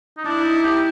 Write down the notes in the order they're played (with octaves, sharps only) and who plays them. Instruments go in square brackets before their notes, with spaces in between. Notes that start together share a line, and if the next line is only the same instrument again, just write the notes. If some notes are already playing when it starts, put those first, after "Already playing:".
[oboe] D#4
[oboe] D4 [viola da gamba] E4
[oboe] D#4
G4